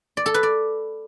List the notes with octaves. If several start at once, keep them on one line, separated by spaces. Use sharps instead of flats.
D5
A4
B4
D5